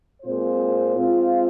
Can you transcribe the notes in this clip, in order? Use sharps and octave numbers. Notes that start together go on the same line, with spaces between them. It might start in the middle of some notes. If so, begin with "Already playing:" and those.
A#2 G#3 C4 F4 C5
G#3 C4 F4